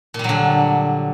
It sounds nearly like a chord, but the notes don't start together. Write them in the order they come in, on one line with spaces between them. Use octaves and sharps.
A#2 G3 F#3 D3